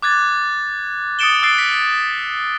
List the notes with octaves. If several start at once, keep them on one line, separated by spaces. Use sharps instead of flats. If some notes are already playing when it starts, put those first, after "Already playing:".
D6 F#6 G#6 A6
D#6 A6 C#7 D7 E7 G7
D#6 E6 F#6 A6 C7 D7
B6